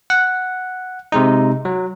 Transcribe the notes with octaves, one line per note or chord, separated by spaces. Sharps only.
F#5
C3 G#3 D#4
F#3